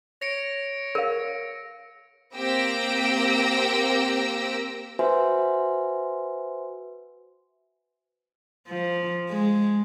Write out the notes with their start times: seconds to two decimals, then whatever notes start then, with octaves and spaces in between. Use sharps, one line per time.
0.22 C#5 A#6 C#7 D7
0.95 A#4 F5
2.35 A#3 C4 G4 E6 A#6 D7
4.99 F#4 B4 C5 E5 G#5 C6
8.68 F3
9.29 G#3